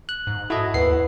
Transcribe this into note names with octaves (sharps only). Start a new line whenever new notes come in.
F#6
G#2
E4 F#4 A4 D#5
D#2 B4 F#5 C7